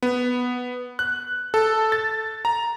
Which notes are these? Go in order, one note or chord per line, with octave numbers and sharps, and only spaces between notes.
B3
F#6
A4
A6
A#5